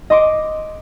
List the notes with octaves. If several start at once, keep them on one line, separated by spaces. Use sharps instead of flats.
D#5 C6 D6 D7